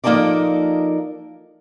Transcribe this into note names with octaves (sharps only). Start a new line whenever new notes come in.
F3 A#3 D#4 A4 A#4 D5